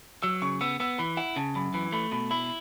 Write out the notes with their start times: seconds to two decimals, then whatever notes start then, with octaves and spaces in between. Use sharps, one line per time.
0.23 F#3 E6
0.42 C#3 C#6
0.61 B3 E6
0.80 B3 E6
0.98 E3 B5
1.17 E4 F#5
1.36 C#3 A5
1.55 F#2 B5
1.74 E3 B5
1.92 A3 B5
2.11 B2 B5
2.30 E4 B5